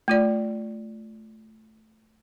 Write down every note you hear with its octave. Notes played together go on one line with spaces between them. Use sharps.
A3 F4 D5